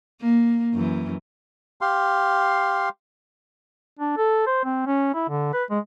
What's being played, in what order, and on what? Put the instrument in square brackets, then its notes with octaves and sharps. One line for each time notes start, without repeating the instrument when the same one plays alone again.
[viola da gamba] A#3
F#2 E3
[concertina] G4 F5 C6
[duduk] D4
A4
C5
C4
C#4
E4
D3
B4
G#3